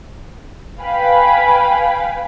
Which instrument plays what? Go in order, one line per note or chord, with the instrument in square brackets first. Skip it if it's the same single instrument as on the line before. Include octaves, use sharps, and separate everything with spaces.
[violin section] B4 F5 G5 G#5 B5